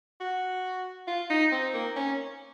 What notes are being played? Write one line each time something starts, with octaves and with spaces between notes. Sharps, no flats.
F#4
F4
D#4
C4
A#3
C#4